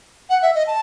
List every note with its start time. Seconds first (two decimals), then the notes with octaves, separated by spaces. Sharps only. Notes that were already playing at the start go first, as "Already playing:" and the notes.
0.30 F#5
0.42 E5
0.55 D#5
0.67 A5